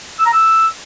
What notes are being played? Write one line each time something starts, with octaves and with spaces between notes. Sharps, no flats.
E6
A#5
E6